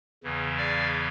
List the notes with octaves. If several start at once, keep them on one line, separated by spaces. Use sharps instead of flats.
E2 C#3 E3
D5 F5